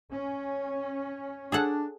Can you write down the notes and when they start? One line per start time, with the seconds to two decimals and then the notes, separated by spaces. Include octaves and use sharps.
0.11 C#4
1.52 D4 G#4 A4 F#5